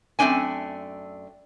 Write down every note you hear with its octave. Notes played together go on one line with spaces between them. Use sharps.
F#2 A3 C4 D4 G#5